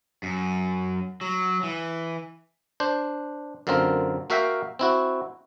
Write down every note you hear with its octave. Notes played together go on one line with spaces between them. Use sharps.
F#2
F#3
E3
D4 C5
F#2 D3 A#3 C4 F4 A#4
A#3 F#4 A#4 E5 F5 G5
C4 E4 F#4